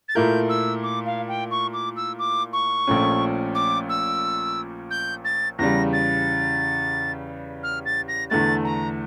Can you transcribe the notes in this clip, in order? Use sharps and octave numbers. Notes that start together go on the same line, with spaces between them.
A6
A#2 A3 E4 A#4 G6
E6
D6
F5
G5
C#6
D6
E6
D6
C#6
A#1 A#2 A3 C#4
D6
E6
G6
A6
E2 C#3 G3 A#6
A6
F6
A6
A#6
E2 D3 A3 A6
A#5